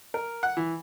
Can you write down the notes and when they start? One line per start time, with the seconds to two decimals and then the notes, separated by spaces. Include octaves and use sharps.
0.14 A#4
0.43 F#5
0.57 E3